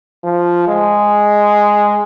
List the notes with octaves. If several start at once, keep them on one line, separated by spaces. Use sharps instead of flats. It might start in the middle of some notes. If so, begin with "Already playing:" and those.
F3
G#3